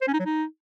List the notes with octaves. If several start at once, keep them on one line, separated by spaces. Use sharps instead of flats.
C5
C#4
D#4
F#3
D#4